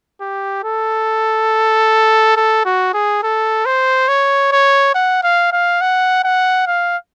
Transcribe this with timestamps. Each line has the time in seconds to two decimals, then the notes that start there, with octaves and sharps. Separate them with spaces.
0.21 G4
0.64 A4
2.37 A4
2.65 F#4
2.94 G#4
3.23 A4
3.66 C5
4.08 C#5
4.52 C#5
4.95 F#5
5.23 F5
5.52 F5
5.81 F#5
6.24 F#5
6.67 F5